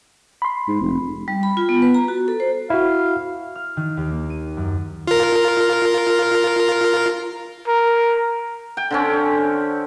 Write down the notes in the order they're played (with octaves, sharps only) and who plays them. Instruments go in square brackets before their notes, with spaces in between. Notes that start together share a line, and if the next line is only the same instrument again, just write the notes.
[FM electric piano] B5 C6
[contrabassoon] G#2
F1
[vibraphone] G3
B5
F4
B3
B4
A#5
F#4
A4
C5
[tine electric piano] E4 F#4 [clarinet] F5
[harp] F6
D#3
D#2
A#3
D#7
F#2
[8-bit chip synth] F4 A#4
[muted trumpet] A#4
[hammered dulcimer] G5
D3 C4 C#4